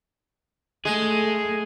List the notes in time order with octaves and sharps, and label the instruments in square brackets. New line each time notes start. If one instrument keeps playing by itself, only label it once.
[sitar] G#3 [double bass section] A3 [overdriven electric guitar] G#4